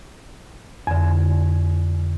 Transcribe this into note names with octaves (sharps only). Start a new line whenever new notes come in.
F2 D3